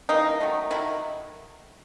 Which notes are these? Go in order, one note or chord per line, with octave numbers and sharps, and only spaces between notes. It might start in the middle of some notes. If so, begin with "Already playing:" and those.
C#3 E3 G3 A#3 D#4
D#3 F#3 A3
D#3 F#3 A3 E4